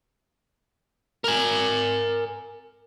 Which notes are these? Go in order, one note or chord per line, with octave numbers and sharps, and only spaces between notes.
A#4 G#5